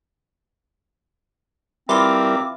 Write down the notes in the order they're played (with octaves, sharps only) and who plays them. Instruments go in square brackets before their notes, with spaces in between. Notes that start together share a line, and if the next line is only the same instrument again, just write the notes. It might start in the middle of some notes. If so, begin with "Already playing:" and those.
[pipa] E3 F4 [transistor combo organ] G3 E4 A#4 [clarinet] C4 [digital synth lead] D6